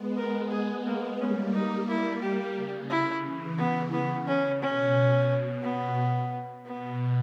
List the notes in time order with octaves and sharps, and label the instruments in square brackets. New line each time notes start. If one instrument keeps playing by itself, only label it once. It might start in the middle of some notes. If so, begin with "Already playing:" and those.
Already playing: [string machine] G#3 B3
[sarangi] A#4
[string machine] G#3 B3 [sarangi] G#4
[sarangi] A#3
[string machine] G3 A#3 [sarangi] C#4
[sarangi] D#4
E4
[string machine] G3 A#3 [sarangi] G4
[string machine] C#3
[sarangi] E4
[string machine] C#3 E3
[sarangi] B3
[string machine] C#3 [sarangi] B3
[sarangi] C#4
[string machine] B2 [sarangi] C#4
[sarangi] B3
[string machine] B2 [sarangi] B3